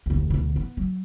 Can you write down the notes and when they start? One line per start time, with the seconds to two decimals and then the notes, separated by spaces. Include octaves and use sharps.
0.06 F1 D2
0.30 D2 B2
0.56 B3
0.77 F#3